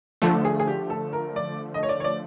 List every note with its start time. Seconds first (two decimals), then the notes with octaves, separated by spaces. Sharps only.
0.22 D3 F3 A3 A4
0.45 G#4
0.60 G#4
0.67 G4
0.90 A4
1.13 A#4
1.36 D5
1.74 D#5
1.83 C#5
1.89 D5
2.00 C#5
2.04 D5